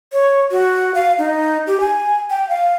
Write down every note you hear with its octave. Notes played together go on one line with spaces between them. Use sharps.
C#5
F#4
F5
D#4
G4
G#5
G5
F5